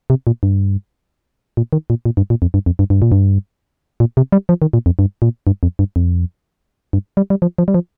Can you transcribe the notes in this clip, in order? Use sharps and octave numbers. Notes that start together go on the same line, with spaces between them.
C3
A#2
G2
A#2
D#3
A#2
A#2
G2
A#2
F2
G2
F2
G2
G2
A#2
G2
A#2
C3
G3
F3
D#3
A#2
F2
G2
A#2
G2
F2
G2
F2
G2
G3
G3
F3
F3
G3
F3